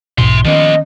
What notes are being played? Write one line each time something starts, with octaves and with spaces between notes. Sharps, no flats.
B1 G#2 B2 E5 C6
D#3 F3 A#3 B3 C#4 D#5